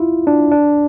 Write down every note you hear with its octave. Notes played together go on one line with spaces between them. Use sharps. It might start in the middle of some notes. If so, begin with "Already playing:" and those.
Already playing: E4 F4
D4
D4